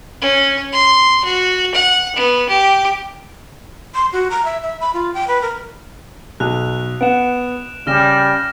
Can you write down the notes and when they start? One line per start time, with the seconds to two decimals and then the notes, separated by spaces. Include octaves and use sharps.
0.21 C#4
0.72 C6
1.25 F#4
1.74 F#5
2.15 B3
2.49 G4
3.94 C6
4.12 F#4
4.30 A#5
4.45 E5
4.63 E5
4.80 B5
4.94 F4
5.14 G5
5.27 B4
5.42 A#4
6.40 B1 F#6 F7
7.01 B3 F#5 D7 E7
7.87 C#3 G3 F6 A#6 E7